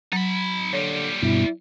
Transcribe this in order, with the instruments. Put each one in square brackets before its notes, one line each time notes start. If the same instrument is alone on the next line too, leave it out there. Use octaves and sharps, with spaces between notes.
[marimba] F#3 [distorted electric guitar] D#4 B5
[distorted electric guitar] A#2 G3 [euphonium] D3 [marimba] C#5
[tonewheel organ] G2 B2 [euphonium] E4